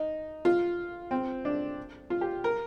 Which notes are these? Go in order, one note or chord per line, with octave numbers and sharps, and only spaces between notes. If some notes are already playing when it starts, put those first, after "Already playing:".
Already playing: D#4
F4
C4
D4
F4
G4
A#4